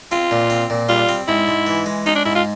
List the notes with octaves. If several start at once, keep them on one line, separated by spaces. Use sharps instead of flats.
C4 F4
A#2
C4
A#2
G3 F4
C4
G#2 E4
G#2
E3
G#3
C#4 D#4
D4
G#2 E4
F4